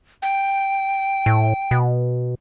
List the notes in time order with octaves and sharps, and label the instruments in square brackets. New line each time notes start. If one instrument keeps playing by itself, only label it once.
[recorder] G5
[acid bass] A2
B2